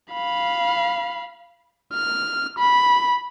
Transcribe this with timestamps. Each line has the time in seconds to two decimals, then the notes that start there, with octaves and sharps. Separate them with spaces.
0.12 F5 B5
1.94 F6
2.59 B5